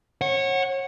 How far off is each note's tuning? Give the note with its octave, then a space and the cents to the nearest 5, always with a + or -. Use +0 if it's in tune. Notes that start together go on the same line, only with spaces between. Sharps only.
C#5 -30 F#5 +0